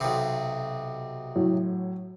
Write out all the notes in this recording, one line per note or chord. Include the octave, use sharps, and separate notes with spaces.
B1 C3
A2 F#3